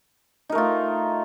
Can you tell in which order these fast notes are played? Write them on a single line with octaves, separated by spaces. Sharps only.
D#4 A#4 A3 F4